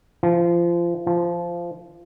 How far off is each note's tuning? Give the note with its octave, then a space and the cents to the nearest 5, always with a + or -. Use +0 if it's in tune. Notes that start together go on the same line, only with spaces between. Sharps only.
F3 -25
F3 -15